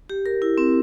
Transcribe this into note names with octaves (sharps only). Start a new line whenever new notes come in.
G4
A#4
E4
C4